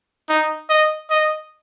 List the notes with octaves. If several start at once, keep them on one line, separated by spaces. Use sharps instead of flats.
D#4
D#5
D#5